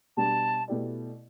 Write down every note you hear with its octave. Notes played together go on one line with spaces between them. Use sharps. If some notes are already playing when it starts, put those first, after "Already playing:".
B2 G3 D4 G4 A5
B2 A3 E4 G4 D5